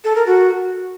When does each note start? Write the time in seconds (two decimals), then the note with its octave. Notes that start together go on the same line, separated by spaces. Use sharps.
0.04 A4
0.15 A#4
0.27 F#4